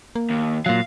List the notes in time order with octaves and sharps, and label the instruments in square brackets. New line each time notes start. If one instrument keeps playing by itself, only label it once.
[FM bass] A#3
[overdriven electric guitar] D#2
[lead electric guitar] A#2 F#3 [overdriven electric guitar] F5